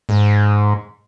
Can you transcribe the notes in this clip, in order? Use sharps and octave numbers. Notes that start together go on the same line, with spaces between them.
G#2